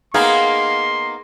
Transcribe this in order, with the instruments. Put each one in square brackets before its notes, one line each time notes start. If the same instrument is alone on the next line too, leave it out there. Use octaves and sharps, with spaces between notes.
[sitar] A#3 B3 D#4 [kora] G#4 [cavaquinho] F5 [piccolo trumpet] C6